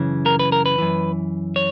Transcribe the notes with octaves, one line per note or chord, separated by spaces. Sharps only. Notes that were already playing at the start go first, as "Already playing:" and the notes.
Already playing: F#2 C#3 E3
A#4
B4
A#4
B4
F#2 E3
C#5